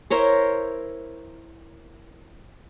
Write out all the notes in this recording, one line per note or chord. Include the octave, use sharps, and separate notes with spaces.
E4 A#4 C5 C#5